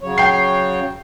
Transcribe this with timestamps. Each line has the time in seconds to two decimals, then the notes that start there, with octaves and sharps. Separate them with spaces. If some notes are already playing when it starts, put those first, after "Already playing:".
0.01 C#3 F#3 C#5
0.18 G5 C7